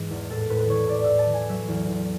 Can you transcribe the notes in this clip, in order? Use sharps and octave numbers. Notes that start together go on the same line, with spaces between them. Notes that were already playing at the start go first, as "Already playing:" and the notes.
Already playing: G#2 E3
E2
A2 A4
A2 B4
B4
E3 C#5
A2 D5
E5
A2
A5
E3
G#5
F#3 E5
E2
E2